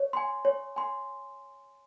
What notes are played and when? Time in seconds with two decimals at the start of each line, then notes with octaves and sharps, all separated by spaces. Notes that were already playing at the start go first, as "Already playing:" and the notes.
Already playing: C#5
0.13 G#5 C6
0.45 C#5
0.76 G#5 C6